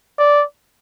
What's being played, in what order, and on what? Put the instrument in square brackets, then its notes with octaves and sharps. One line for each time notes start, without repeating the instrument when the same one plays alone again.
[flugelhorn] D5